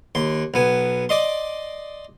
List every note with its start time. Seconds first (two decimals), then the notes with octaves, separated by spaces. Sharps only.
0.15 D#2 C6
0.54 B1 B3 G#5
1.09 D5 D#5 C6